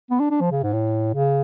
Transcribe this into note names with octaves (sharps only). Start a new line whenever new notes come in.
B3
D4
D4
F3
C#3
G#2
A2
C#3